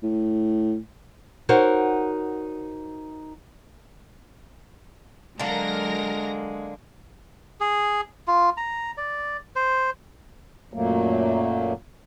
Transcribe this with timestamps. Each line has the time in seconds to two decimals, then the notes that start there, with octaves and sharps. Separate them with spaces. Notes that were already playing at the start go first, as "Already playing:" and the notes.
0.03 A2
1.49 D#4 F#4 A#4 C5 C#5
5.39 D3 F#3 G#3 A#3 A#4 A#6
7.60 G#4
8.27 F4
8.57 A#5
8.97 D5
9.56 C5
10.74 F#2 A#2 F#3 A3 A#3